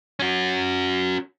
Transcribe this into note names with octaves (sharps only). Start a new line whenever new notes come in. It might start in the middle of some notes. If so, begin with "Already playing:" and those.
C#4 F#4